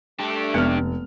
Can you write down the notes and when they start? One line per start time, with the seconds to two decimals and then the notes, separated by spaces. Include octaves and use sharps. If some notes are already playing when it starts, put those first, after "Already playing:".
0.20 A3 D4 G4
0.54 F1 G#3 B3 F6